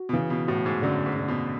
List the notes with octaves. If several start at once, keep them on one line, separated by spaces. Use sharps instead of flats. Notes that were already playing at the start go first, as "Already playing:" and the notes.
Already playing: F#4
B2
C#3 E3
B2
A2 F#4
G#2
F#2 D3
G#2
D3
B2